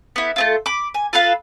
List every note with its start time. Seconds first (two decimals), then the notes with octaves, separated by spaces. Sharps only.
0.16 B3 E4
0.36 A3 C4 F4
0.66 B5 D6
0.94 G#5
1.13 F4 A4 B4 F5